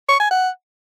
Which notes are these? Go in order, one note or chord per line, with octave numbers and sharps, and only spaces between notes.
C#6
G#5
F#5